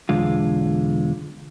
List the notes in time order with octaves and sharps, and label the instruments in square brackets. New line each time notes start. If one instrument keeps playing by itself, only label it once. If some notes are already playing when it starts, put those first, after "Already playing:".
[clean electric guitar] B1 E2 D3 G#3 F4